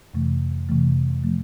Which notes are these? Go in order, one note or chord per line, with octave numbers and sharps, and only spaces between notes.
F2 C3 E3 A3
F2 C3 E3 A3
F3 A3